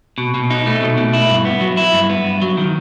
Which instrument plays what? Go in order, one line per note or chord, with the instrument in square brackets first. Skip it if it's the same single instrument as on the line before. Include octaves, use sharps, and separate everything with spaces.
[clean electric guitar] B2
B2
D#4
A3
B2
B2
E4
G2
B3
F#3
E4
G2
B3
G2
F#3
D#3